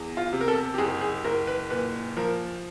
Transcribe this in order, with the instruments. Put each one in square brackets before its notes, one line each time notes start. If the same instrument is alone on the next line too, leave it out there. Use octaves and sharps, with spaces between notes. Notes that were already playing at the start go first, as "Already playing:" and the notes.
Already playing: [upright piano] E2
F4
C3
A#4
A4
G4
F#1 G#4
G#4
F#1 A#4
B4
A#2 B4
F3 A#4